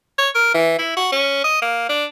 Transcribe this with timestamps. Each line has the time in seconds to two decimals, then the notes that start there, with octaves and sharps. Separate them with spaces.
0.18 C#5
0.35 A#4
0.54 E3
0.79 E4
0.97 F#4
1.12 C#4
1.44 D#5
1.62 A#3
1.89 D4